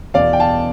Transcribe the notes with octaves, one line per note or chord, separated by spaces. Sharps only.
E2 B2 D5 F5
G5
F5 A5